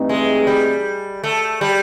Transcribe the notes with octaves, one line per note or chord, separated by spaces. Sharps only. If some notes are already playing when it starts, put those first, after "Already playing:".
Already playing: G2 E3 A3 C4 D#4
G#3
G3
A3
G3